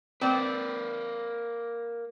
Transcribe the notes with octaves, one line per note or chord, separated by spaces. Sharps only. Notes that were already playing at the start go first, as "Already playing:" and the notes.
A#3 C4 B4 D5